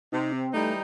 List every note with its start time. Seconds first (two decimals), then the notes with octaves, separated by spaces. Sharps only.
0.12 C3 D#4
0.33 C4
0.54 E3 G3 A3 D#4